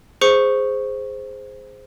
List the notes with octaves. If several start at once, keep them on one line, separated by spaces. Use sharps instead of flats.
G#4 C5 C#6 C#7